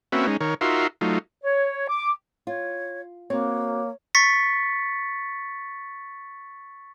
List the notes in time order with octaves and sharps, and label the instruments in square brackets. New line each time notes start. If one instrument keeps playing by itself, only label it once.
[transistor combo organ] A#3 C4 C#4 F#4 B4 E5
G#3 C#4 D#4
D#3 A#4 C#5
D#4 F4 F#4 A#4 E5 C6
F#3 A3 D#4 F4
[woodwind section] C#5
D6
[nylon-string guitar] F4 [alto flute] C#5
[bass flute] A#3 [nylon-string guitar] C4 [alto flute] F#4 [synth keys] C#5
[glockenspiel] C#6 A6 B6 C#7